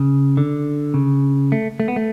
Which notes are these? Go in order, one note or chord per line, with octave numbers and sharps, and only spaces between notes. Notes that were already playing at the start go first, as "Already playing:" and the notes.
Already playing: C#3
D3
C#3
A3
A3
B3
A3